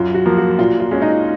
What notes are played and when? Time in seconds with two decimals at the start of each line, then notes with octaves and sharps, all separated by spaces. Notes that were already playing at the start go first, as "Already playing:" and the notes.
Already playing: F#2 F4
0.14 F#4
0.26 F3 A#3
0.37 F#4
0.58 A#2 F4
0.80 F4
0.91 G#3 C#4
1.02 D#4